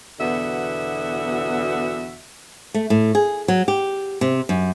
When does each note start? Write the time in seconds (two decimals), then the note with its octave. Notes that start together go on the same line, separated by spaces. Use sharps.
0.20 E2 B2 D3 B3 F#4 E5
2.74 A3
2.90 A2
3.15 G#4
3.48 F#3
3.68 G4
4.21 C3
4.49 F#2